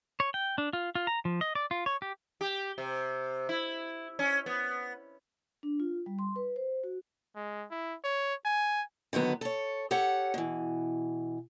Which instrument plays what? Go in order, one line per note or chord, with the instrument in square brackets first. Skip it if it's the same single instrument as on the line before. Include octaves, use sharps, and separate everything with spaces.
[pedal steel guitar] C#5
G5
D4
F4
F4
A#5
F3
D#5
D5
F4
C#5
G4
[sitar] G4
C3
E4
C#4
B3
[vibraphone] D4
F4
G3
C6
B4
C5
F#4
[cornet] G#3
E4
C#5
G#5
[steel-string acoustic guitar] D3 D#3 F#3 B3
A4 C#5
G4 A4 C#5 F#5
B2 E3